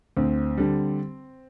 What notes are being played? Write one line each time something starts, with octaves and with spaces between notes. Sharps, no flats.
D2 C4
D3 G3